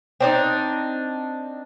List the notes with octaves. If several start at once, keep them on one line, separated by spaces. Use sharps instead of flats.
C4 D4 D#4